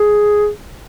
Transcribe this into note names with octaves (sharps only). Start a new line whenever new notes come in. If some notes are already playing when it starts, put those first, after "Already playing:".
Already playing: G#4